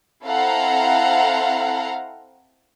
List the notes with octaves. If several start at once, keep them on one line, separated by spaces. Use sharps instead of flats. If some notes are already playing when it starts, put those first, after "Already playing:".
C4 E4 A4 F5 F#5 A#5